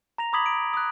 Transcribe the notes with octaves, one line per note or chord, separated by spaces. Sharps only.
A#5 A#6 F7
B5 D6 D#6 G#6 B6 F#7
D7
D#6 F#6